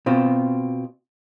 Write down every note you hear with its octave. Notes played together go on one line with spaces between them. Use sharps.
B2 C4 F4